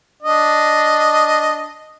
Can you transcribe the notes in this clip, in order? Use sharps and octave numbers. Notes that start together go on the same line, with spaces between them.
D4 D#5